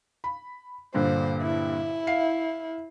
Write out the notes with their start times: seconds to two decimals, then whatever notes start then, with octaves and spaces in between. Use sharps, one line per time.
0.24 B5
0.94 G2 A#2 D3 C5
1.43 E4
2.07 F5 C7